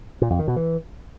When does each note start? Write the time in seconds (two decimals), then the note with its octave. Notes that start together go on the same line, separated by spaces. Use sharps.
0.22 A#2
0.30 F2
0.39 D#3
0.48 B2
0.56 E3